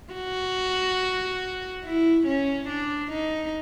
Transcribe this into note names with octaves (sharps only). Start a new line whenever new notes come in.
F#4
E4
C#4
D4
D#4